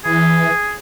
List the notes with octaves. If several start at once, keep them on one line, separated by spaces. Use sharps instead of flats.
E3 G#4